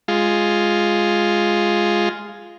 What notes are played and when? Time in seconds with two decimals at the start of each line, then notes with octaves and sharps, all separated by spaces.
0.08 G#3 F4